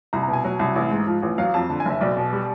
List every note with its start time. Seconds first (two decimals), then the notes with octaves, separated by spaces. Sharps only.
0.13 C2 A#5
0.23 B2 A#5
0.33 G#5
0.45 F#3
0.59 C2
0.76 A1
0.91 G#2
1.07 F3
1.23 A1
1.38 F#3 F5
1.54 F2 A5
1.69 D3 A5
1.80 G#5
1.85 F#1
1.91 E5
2.01 B1 D5
2.17 B2
2.33 G3